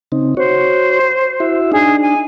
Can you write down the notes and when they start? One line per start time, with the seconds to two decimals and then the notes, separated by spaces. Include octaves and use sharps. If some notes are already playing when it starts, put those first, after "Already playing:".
0.12 C#3 C4 D#4
0.37 F#4 C5 C#5
1.40 E4 F#4 E5
1.72 D4 D#4 G#4
2.01 G#5